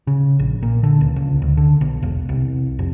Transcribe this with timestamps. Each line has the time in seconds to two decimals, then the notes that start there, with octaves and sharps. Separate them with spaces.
0.07 C#3
0.39 A#1
0.63 A#2
0.83 D3
1.01 C#2
1.16 C#2
1.42 D2
1.57 D3
1.81 B1
2.03 E1
2.29 C2
2.79 F1